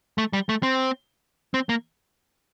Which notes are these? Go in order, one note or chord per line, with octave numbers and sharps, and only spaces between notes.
A3
G3
A3
C4
C4
A#3